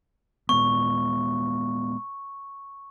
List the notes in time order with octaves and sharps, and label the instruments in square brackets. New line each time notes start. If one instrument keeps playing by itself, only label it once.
[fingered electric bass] A#2 G#3 B3 [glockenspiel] C#6